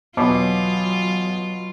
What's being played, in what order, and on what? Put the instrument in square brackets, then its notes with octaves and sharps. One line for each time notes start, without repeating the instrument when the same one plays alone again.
[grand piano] E2 C#5 D6 [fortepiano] B2 [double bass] F#3 [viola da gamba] F4